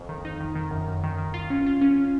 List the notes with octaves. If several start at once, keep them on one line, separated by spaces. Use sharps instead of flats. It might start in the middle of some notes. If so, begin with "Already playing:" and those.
Already playing: F2
D#3
D#4
D#3
D#3
F#2
F#2
D#3
D#3
F4
C#4
F4
C#4